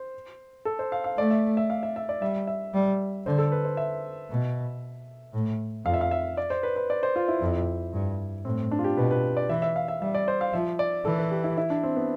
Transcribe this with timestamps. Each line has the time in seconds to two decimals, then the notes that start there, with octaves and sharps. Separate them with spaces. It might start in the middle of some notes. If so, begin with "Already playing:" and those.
Already playing: C5
0.65 A4
0.79 C5
0.92 F5
1.04 F5
1.17 A3 D5
1.31 E5
1.57 E5
1.70 F5
1.83 E5
1.96 E5
2.09 D5
2.21 G3 E5
2.47 E5
2.74 G3
3.26 D3 C5
3.38 A4
3.52 B4
3.65 C5
3.77 E5
4.30 B2
5.33 A2
5.85 F2 F5
5.94 E5
6.01 F5
6.11 E5
6.37 D5
6.50 C5
6.63 B4
6.76 B4
6.90 D5
7.03 C5
7.16 F4
7.28 E4
7.41 F2
7.93 G2
8.45 A2 C4
8.71 D4
8.79 F4
8.84 G4
8.97 B2 B4
9.11 B4
9.37 D5
9.49 E3 E5
9.62 E5
9.76 F5
9.88 E5
10.01 G3 E5
10.15 D5
10.28 C5
10.41 F5
10.53 F3 E5
10.79 D5
11.05 E3 A4
11.18 B4
11.31 G4
11.44 E4
11.58 E4
11.70 D4
11.83 C4
11.96 B3